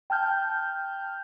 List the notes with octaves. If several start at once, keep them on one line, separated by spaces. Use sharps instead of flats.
G5 A5 F6 G6